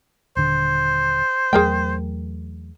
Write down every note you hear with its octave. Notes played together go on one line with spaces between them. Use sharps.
D#1 D3 C5
E2 F#3 A3 G#4 A#4 G5